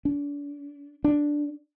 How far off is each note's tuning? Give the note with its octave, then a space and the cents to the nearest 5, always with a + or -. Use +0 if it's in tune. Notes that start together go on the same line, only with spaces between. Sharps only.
D4 -35
D4 +0